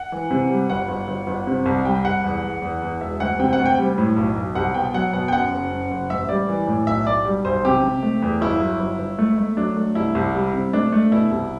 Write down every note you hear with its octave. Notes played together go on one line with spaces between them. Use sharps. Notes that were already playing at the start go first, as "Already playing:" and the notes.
Already playing: F#5
E3
C3
G3
G1 F#5
G1
G1
G1
C3
C2
G3 G5
C2 F#5
E2
E2
E2
E2
E1 E5
D2 F#5
C3 G5
F#5
D2
G5
G3
A2
B1
B1
C2 F#5
B2 G5
F#3 F#5
B2 F#5
G5
F#2 F#5
F#1
F#2
F#1
A1 E5
G3 D5
E3
A2
B1 E5
B1 D5
G3
B1 C5
C3 G4
C3
A3
E2
G1 E4
F#3
G1
G1
A3
A3
F#3 D4
A3
C2 E4
C2
G3
C3
A3 D4
A3
B2 E4
C2